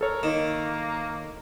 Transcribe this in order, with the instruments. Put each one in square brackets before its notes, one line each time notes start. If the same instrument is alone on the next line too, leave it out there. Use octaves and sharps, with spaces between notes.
[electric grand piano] A4 C#5 [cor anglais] A#4
[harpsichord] D#3 [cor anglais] A#3